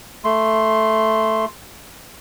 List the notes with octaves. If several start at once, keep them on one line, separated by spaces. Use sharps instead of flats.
A3 C6